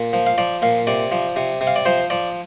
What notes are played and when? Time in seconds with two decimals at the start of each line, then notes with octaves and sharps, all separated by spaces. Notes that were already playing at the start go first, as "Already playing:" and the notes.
Already playing: A#2
0.13 F3
0.26 F5
0.38 F3 D5
0.62 A#2 F5
0.87 C3 D5
1.12 F3
1.36 C3
1.61 C3
1.67 F5
1.76 D5
1.86 F3 C5
2.10 F3 D5